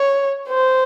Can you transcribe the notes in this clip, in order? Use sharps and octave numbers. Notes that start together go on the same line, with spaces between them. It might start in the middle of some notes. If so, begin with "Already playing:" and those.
Already playing: C#5
C5